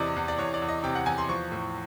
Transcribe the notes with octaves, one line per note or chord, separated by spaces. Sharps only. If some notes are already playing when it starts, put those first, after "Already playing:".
Already playing: E2 C3 E3 D5 D#5
E2
D5
E2 C#5
D5
E2
D#5
C3 G5
F#5
E2 G#5
C6
F3 C#6
A2